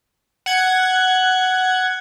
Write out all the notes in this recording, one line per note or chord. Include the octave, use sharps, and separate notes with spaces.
F#5 G#6